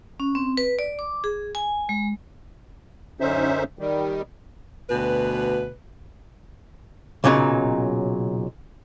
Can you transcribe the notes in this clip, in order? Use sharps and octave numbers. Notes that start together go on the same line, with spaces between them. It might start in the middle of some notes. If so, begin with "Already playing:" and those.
C#4
C4
B4
D5
D6
G#4
G#5
G#3
F#2 D3 C#4 D#4 C5 E5
D#3 G3
D2 B2 B4
B1 A#2 C#3 F#3 D#4